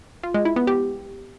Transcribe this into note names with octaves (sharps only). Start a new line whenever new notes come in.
F4
G#3
E4
B3
G4